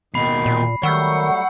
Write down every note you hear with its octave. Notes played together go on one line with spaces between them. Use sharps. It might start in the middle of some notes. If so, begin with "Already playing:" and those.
D#2 B2 D#3 D#4 B5 C7
A#2
D#3 F#3 G3 A3 F#5 C#6 E6 G6